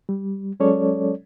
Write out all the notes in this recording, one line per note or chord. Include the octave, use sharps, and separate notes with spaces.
G3
F#3 G#3 C#4 A4 C#5 D5